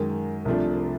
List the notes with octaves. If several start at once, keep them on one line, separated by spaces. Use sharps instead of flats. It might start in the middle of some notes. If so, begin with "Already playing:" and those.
Already playing: F#2 D#3 G#3
C2 C3 F3 A3 D4